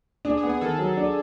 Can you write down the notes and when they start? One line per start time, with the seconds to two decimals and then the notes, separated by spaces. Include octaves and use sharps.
0.25 D4 G#4
0.37 G#4
0.43 B3
0.49 G#4
0.61 D#3 A4
0.78 F#3
0.97 D4